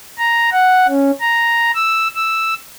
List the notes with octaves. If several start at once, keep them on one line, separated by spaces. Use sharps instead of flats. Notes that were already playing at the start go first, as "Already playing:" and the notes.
A#5
F#5
C#4
A#5
E6
E6